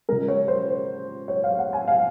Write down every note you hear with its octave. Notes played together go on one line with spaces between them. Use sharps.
C#3 F3 G#3 A#4
C#5
C5
C#5
F5
F#5
G#5
F5